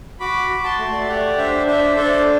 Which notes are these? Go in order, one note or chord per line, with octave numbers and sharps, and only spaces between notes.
F#4 B5 D6
F#4
A5 C6
A3
D5
E5
G4 D5 F#5
D4 C5 E5
D4 C5 E5
D4 A4 C5